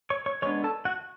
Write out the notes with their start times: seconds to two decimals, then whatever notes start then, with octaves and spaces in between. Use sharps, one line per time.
0.10 C#5 C#6
0.26 C#5 C#6
0.42 G#3 B3 D4 C#5 C#6
0.64 A4 A5
0.85 F#4 F#5